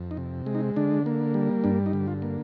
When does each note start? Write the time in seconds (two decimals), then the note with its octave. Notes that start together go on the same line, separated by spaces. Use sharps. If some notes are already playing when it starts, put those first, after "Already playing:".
Already playing: F2
0.11 D#4
0.17 C3
0.46 G#3
0.55 D#4
0.76 D3 D4
1.06 A#3
1.34 G3
1.64 G2 D4
1.86 D#4
1.93 D3
2.07 F4
2.22 A#3